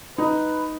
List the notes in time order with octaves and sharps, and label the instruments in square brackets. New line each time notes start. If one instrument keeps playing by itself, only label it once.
[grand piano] D#4 [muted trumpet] B4